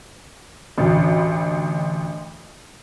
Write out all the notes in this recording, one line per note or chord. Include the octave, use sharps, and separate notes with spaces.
A1 D2